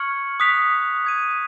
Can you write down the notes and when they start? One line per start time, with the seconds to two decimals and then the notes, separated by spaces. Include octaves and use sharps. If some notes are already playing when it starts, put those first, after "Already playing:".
Already playing: C#6 F6 G#6 C#7 F#7
0.40 D#6 F#6 B6 F7
1.04 D#6 G#6 D#7